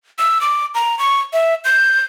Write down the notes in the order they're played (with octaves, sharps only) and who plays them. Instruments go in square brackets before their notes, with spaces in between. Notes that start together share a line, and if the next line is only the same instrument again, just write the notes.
[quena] E6
D6
A#5
C#6
E5
G6